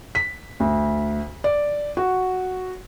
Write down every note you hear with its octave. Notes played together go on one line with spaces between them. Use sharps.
B6
D2
D5
F#4